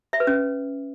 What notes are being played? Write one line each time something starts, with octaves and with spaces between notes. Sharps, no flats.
E5
B4
C#4